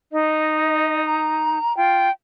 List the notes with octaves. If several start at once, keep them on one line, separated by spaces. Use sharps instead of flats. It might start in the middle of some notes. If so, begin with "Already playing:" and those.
D#4 D#5
A#5
F4 G5